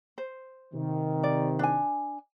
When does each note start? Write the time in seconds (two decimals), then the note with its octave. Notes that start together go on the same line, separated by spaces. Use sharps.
0.18 C5
0.74 C3 D#3
1.23 D5
1.59 D4 G#5